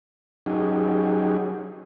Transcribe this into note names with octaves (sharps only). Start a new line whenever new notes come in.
F#3 C#4 D#4 G4 G#4